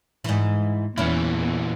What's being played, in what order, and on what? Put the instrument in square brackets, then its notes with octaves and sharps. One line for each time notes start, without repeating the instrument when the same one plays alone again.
[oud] G#2 E3
[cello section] E2 [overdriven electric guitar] A#2 E3 [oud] C#4 E4